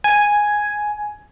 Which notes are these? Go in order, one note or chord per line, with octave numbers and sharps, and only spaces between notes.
G#5